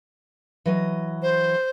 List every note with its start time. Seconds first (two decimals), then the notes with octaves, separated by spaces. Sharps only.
0.66 E3 F#3 D#5
1.22 C5